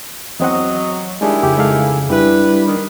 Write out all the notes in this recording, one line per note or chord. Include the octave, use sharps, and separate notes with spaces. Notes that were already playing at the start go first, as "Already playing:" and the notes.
E2 F#3 C4 D#5 F#5
D#3 G3 G#3 D4 E4 G4 G#4
F2 C#3 G4
G#3 A4 F5
G3 D4 E4 G4 B4
D#3